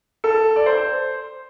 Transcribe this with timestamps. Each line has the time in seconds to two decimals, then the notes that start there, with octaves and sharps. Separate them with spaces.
0.24 A4
0.56 D5
0.66 C5